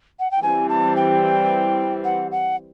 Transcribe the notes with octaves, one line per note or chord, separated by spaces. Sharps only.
F#5
G5
E3 G3 C4 G#5
A5
G5
F#5
F#5